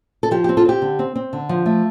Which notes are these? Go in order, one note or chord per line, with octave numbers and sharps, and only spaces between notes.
A4
F3 G4
G4
C4
F4 A4
C4 G4
D3
C4
C4
D3
F3
A3